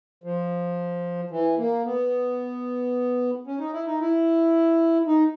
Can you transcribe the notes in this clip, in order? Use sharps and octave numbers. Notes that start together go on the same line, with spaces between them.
F3
E3
A#3
B3
C#4
D#4
E4
D#4
E4
D#4